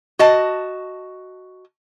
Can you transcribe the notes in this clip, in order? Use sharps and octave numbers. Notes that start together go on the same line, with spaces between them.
F#4 D#5 A5